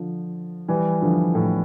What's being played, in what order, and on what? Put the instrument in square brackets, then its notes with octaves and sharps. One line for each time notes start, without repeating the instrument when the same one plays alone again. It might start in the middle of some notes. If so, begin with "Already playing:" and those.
Already playing: [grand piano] D3 F3
E3 G3
D3 F3
A2